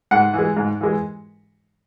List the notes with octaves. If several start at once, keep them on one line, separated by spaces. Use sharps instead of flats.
G#2 F#5
E3 G#3
G#2
E3 G#3